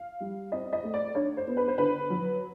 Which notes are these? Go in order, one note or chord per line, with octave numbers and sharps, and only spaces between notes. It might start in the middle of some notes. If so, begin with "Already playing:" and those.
Already playing: F5
G3
C4 D#5
D#5
A3
D5
D4 C#5
C5
B3
B4
C5
D3 B4
F#3